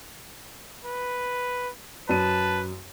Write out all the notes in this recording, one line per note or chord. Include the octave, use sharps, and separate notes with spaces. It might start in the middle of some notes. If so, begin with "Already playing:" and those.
B4
F#2 B4 A5 D#7